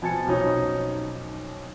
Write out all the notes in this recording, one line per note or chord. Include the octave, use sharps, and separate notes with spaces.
F2 B2 G#5 A5 C#7
B1 F2 B2 F#3 C#4 D#4